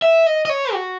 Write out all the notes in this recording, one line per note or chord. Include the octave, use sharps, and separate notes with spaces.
E5
D#5
D#5
C#5
F#4